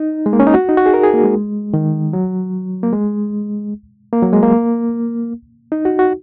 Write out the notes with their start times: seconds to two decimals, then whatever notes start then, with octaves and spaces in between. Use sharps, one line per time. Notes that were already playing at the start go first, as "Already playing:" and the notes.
Already playing: D#4
0.26 G#3
0.33 A#3
0.40 C#4
0.47 D#4
0.54 F#4
0.69 D#4
0.77 F#4
0.86 G#4
0.94 A#4
1.04 G#4
1.14 A#3
1.24 G#3
1.74 D#3
2.13 F#3
2.83 A#3
2.93 G#3
4.13 A#3
4.23 F#3
4.33 G#3
4.43 A#3
5.72 D#4
5.85 F#4
5.99 F#4